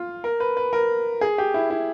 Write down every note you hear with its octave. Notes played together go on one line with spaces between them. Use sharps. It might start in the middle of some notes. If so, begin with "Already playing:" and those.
Already playing: F4
A#4
B4
B4
A#4
G#4
G4
E4
E4